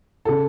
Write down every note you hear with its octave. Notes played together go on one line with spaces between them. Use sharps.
C#3 A4